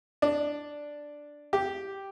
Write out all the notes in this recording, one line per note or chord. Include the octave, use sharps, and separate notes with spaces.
D4
G4